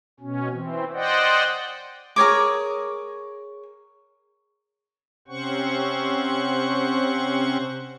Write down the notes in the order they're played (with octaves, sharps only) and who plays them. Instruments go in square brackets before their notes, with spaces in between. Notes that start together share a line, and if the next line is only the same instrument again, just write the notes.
[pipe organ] B2 C#4
E3 C4
C5 D5 D#5 F#5 G5
[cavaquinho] G#4 A#4 C#5 D6
[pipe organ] C3 C4 C#4 C5 F#5 C#6